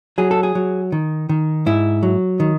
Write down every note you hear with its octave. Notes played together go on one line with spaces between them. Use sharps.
F#3 G#4
A4
G#4
F#3
D#3
D#3
G#2 E4
F#3
D#3